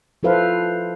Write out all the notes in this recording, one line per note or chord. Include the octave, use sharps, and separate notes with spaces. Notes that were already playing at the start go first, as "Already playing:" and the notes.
F3 E4 A4 B4 C5 F5